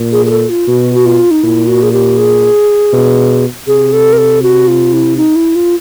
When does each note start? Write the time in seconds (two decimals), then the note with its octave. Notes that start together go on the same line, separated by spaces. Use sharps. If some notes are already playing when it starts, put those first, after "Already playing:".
Already playing: A#2
0.12 G#4
0.26 G#4
0.30 A4
0.49 F4
0.68 B2 F#4
0.95 F#4
1.05 F4
1.31 D#4
1.43 A#2 E4
1.67 F#4
1.83 G#4
1.92 G4
2.18 G#4
2.93 B2
3.67 C3 G#4
3.93 A4
4.13 A#4
4.18 A4
4.42 F#4
4.68 F4
4.93 E4
5.17 D#4
5.36 E4
5.55 F4